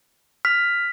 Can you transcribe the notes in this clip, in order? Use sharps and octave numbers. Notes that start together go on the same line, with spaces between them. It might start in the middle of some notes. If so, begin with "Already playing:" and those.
F6 B6